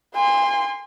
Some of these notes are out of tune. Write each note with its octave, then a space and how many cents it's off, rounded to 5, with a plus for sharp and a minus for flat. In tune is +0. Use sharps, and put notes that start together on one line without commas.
G#5 -40 C6 +0